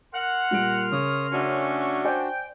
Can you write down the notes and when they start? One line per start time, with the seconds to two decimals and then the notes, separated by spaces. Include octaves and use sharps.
0.13 A#4 F#5 C6 F6
0.51 A#2 G3 D7
0.92 C#3 C#5 D#6
1.33 F#3 A3 C#4 D4 F#4
2.04 C5 D5 G5 G#5